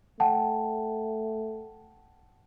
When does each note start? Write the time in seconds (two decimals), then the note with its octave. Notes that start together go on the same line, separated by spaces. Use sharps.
0.20 A3 F#5 G5 A5